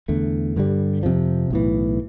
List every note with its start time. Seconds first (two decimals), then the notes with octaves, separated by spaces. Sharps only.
0.08 E2 D3 A3
0.56 G2 D3 G3
1.03 F2 C3 F3
1.50 B1 A2 E3